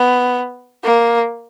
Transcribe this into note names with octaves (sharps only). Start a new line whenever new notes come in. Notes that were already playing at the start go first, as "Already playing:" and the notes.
Already playing: B3
A#3